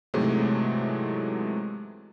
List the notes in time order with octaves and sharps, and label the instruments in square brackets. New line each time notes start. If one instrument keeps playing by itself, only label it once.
[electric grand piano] G#2 C3 E3 F#3 G#3 A3